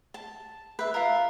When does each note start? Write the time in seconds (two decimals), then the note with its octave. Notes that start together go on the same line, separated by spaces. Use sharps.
0.14 A5
0.79 B4 E5
0.94 F4 A#4